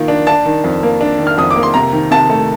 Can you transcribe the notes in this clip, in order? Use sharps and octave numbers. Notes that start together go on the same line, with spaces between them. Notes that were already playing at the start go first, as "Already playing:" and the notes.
Already playing: D#3 A#3 F4
D4
D4 A5
D#3
F2
A#3
D4
D#3
F6
F2 D#6
D6
A#3
C6
C3 A#5
D#3
C3 A5
A3